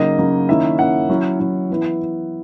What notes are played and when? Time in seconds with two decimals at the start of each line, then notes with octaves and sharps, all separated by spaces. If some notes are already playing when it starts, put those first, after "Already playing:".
Already playing: C#3 F#3 A#3 D#4 D#5
0.18 C#3 F#3 A#3 D#4
0.49 D#3 A#3 C#4 E4 E5
0.79 D#3 A#3 C#4 E4 F#5
1.10 F#3 C#4 E4
1.40 F#3 C#4 E4
1.70 E3 B3 E4